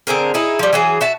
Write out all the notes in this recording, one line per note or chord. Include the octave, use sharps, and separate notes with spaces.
D3 C4 G#4 A#4
D#4 E4 G#4
F3 G3
E3 F#3 G#4
F#4 E5 A5